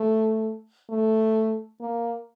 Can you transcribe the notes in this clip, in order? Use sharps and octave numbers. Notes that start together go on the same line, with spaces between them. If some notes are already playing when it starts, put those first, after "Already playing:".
Already playing: A3
A3
A#3